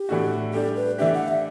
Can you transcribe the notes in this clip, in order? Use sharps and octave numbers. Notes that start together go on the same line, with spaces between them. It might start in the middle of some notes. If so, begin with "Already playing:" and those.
Already playing: G4
A2 E3 A3 D4 F#4
G3 D4 G4 A4
B4
E3 A3 D4 G4 E5
F#5
E5